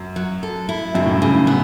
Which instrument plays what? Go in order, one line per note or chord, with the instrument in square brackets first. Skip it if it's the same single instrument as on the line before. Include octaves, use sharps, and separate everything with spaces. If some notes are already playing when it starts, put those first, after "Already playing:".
Already playing: [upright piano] F#2
[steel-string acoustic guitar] F#3
A4
E4
[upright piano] F#2 [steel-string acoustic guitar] C#3
[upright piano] A2
G2
[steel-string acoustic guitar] C#3
[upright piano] A2
[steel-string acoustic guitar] B3